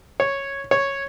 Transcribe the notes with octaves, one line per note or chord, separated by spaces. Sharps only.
C#5
C#5